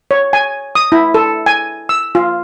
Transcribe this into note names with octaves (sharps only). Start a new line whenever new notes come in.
C#5
G#5
D#6
E4
A4
G#5
E6
F4